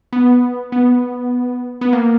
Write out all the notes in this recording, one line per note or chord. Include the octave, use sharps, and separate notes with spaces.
B3
B3
B3
A#3